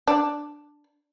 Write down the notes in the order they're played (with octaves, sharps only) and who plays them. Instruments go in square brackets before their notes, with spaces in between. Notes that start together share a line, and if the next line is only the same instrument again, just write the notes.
[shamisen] D4